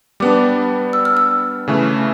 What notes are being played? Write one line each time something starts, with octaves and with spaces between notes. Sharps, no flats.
G3 B3 D4 D6
E6
F6
E6
C#3 E3 A3